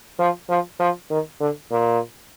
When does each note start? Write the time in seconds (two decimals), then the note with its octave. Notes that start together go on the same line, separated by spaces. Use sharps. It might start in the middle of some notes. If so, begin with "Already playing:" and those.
0.19 F3
0.49 F3
0.80 F3
1.10 D#3
1.40 D3
1.71 A#2